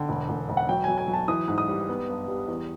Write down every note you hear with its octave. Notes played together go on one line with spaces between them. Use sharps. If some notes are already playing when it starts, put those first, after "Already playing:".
Already playing: D3 G5
E1
E1
E1
F#5
F#3 G5
F#3 G#5
G#5
F#3
A5
E3 D#6
G#2
D#6
G3
B3
G2
G3
E2